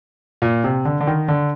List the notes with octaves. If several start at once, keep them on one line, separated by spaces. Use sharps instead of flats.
A#2
C3
D3
D3
D#3
D3